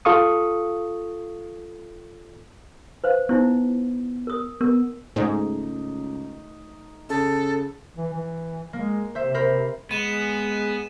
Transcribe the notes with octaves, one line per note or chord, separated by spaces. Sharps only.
F4 A4 F5 C#6 D#6
B4 C5 F5
B3 D#4 E4 C5
A#4 D#6
B3 A#4
C#2 G#2 A3 D#4
C#3 A4
E3
E3
G#3 A#3
C3 C5 E5
A#4 C5 B5
G#3 B3 D#7 E7